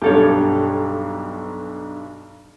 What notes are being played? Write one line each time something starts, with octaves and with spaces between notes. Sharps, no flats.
B1 G2 G4 A4 C#5